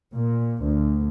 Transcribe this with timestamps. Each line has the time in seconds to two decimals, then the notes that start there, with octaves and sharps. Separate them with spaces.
0.14 A#2
0.65 D2